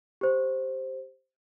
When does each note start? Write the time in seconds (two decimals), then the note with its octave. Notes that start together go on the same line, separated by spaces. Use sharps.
0.21 G4 C5